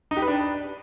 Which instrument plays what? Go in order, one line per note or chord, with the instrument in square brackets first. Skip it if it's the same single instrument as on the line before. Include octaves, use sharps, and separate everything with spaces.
[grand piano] D#4
G4
B4
D4